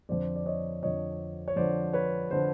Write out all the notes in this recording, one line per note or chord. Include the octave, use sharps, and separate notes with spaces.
F2 D3 F3 C5 D5
D5
C#5 D#5
F2 D3 F3 C#5 D#5
C#5
F2 D3 F3 C5 D5
B4 C#5
D3 F3 C5